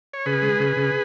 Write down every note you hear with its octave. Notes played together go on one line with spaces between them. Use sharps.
C#5
C#3 G#4 B4
G#3
C#3
C#3